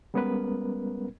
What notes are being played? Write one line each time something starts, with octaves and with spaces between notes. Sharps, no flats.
G3 G#3 B3 C#4 A#4 B4